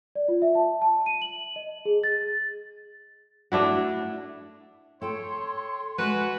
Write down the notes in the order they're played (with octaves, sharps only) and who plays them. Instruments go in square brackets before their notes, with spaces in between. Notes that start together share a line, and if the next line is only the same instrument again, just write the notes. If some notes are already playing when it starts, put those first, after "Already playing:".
[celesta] D5
F4
E5
A5
A5
D#7
F#7
D#5
G#4
A6
[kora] A3 D4 E4 F#4
[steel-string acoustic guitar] A4 G5 [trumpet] C#5 [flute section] C6
[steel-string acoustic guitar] G#3 [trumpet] F#4 [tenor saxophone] B4